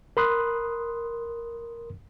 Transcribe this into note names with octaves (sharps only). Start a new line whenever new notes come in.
A#4 B5 C6 D#6 F#6